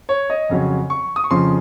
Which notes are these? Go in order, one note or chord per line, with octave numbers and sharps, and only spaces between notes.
C#5
D#5
F2 C#3 F#3 C#4
C#6
D#6
C#6
F2 C#3 F3 C6